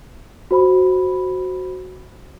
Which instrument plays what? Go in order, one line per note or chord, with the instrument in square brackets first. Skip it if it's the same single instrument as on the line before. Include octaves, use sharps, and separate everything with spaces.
[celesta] F#4 C5 B5